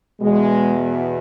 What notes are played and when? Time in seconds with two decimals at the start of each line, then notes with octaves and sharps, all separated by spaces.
0.20 E2 B2 G#3